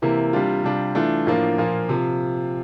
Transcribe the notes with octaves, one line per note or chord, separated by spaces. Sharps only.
C3 E3 A#3 E4
C3 G3 D4 F4
C3 G3 D4 F4
E3 A3 D4 F4
A2 F3 A#3 D4 F4
A#2 F3 A#3 F4
C3 F3